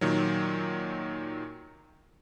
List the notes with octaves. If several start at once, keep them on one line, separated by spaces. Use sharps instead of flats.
A#2 D#3 F#3